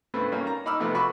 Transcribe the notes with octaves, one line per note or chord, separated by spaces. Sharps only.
G2 A3 B3 C4 B4
G3 A#3 C#4
A#5
D#4 B5 D6 E6 F6
C3 F3 A3 B3
F#4 A4 B4 B5 C#6 D6